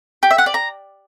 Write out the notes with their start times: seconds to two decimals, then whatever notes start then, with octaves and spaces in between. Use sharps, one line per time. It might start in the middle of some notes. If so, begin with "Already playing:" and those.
0.23 G4
0.31 E5
0.38 F#5
0.46 D5
0.54 A#5